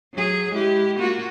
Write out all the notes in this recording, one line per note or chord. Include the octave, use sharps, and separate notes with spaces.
F#3 G#4
G#3 E4 G4
A#3 F4 F#4